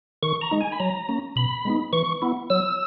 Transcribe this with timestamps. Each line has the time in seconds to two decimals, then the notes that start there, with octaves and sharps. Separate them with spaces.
0.23 D#3 C#6
0.41 A#5
0.51 G#3 D#4
0.61 G#5
0.72 B5
0.80 F#3 A#5
1.09 A#3 C#4
1.36 B2 B5
1.65 G#3 B3 D#4
1.93 E3 C#6
2.22 B3 E4
2.50 F#3 E6